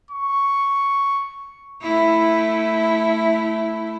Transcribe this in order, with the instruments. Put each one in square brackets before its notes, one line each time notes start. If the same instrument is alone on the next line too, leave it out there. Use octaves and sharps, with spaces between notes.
[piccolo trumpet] C#6
[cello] A3 E4